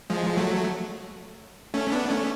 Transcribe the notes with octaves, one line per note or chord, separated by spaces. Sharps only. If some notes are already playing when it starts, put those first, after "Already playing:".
F3 G#3
F#3 A3
A3 C#4
B3 D4
A3 C#4